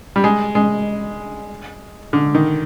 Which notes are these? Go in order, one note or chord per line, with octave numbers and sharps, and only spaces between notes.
G3
G#3
G#3
D3
D#3